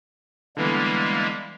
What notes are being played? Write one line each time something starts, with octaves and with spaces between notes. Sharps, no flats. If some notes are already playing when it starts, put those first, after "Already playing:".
D3 E3 G3 G#3 A#3 B3